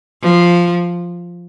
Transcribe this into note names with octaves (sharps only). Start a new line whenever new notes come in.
F3